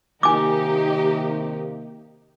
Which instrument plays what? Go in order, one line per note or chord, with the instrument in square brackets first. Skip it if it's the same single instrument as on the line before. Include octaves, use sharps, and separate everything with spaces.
[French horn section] C3 D#3 A#3 [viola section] D#4 G4 [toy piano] G#5 D6